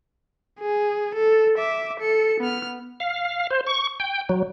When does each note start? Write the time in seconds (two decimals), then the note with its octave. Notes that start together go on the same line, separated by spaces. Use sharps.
0.60 G#4
1.14 A4
1.58 E5 D6
2.00 A4 C#7
2.40 B3 F6
3.00 F5
3.51 C5
3.67 C#6
4.00 G5
4.29 F#3